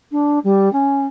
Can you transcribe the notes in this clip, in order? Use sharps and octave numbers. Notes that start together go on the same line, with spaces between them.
D4
G3
C#4